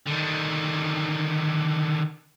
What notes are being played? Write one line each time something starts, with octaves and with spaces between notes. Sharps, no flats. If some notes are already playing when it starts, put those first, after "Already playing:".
D3 D#3